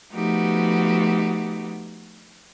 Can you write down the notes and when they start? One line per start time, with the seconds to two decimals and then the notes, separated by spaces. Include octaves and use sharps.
0.13 F3 A3 B3 D#4 F#4 G4